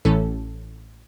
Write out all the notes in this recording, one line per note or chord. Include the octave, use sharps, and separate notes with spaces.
A1 A2 E3 A3 C#4 A4